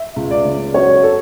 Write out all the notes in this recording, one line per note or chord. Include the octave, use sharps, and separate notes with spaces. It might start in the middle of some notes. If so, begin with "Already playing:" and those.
Already playing: E5
C#2
D5
C#3
F#3 C#5
A4